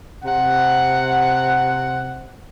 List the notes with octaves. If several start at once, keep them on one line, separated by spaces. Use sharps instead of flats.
C3 F#5